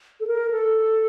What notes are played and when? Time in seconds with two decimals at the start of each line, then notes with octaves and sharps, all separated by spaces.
0.20 A4
0.27 A#4
0.51 A4